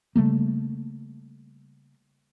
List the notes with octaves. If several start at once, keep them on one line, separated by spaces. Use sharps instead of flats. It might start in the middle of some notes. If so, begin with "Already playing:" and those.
C#3 G3 A3 A#3